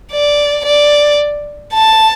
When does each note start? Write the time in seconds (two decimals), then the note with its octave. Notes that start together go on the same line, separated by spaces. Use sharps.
0.12 D5
0.66 D5
1.74 A5